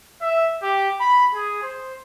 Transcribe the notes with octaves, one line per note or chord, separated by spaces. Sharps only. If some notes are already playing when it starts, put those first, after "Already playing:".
E5
G4
B5
G#4
C5